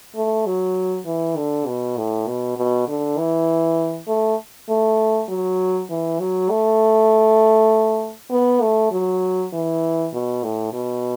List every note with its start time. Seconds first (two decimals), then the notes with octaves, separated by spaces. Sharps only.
0.16 A3
0.46 F#3
1.06 E3
1.36 D3
1.67 B2
1.97 A2
2.27 B2
2.57 B2
2.88 D3
3.18 E3
4.08 A3
4.69 A3
5.29 F#3
5.90 E3
6.20 F#3
6.50 A3
8.31 B3
8.61 A3
8.92 F#3
9.53 E3
10.13 B2
10.43 A2
10.73 B2